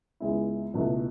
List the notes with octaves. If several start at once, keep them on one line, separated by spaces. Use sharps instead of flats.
C#2 C#3 G#3 B3 E4
C#2 B2 A3 E4